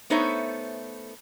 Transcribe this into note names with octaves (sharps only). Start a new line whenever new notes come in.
A3 B3 D#4 C5 C#5 E5